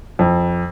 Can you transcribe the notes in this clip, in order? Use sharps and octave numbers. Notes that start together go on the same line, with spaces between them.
F2